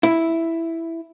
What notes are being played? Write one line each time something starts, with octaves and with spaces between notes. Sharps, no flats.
E4